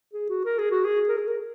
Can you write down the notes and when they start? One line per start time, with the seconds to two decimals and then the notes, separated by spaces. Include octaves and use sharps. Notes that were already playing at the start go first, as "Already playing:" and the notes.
0.13 G#4
0.29 F#4
0.45 A#4
0.59 G#4
0.71 F#4
0.85 G#4
1.08 A#4
1.18 G#4
1.27 A#4